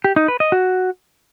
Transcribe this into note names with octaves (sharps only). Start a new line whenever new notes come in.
G4
D#4
B4
D#5
F#4